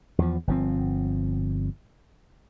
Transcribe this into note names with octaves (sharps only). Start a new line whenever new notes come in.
E2 F3
G1 F3 C4